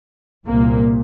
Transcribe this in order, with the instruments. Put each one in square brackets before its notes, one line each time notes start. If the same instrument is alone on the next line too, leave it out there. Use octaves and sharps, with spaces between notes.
[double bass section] C2 A#2 A#3